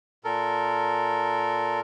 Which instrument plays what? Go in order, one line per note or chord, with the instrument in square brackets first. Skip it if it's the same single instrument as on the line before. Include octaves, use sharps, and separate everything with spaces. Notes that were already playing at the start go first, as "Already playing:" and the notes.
[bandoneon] A#2 A4 A#4